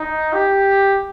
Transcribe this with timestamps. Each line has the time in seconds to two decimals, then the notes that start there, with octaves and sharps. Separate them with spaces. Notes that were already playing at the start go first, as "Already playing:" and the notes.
Already playing: D#4
0.33 G4